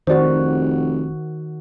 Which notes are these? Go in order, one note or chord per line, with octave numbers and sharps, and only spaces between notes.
F1 D#3 F#4 C5 D5